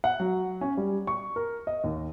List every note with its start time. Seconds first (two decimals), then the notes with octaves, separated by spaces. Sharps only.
0.04 F#5
0.20 F#3
0.61 C#4
0.77 G3
1.07 C#6
1.36 A#4
1.67 D#5
1.84 D#2